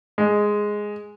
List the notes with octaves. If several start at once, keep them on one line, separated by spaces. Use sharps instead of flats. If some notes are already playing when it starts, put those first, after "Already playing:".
G#3